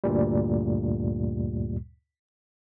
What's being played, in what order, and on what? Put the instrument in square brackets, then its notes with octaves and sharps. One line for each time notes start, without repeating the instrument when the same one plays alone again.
[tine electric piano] D2 G2 A#2 G3